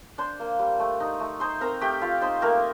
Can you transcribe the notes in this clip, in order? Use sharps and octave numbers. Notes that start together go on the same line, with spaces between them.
D4 C5 C6
A#3
G3
A3
D#4
A3
D#4 C5 C6
C4 A#4 A#5
A3 G4 G5
A3 F4 F5
C4 D#4 C5
A3 A#3 A#4